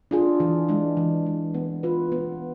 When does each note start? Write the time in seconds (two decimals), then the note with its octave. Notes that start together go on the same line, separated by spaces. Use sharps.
0.11 D4 F4 G#4
0.40 E3
0.69 G#3 D4
0.97 E3
1.26 G#3 D4
1.54 B3
1.83 F4 B4
2.12 B3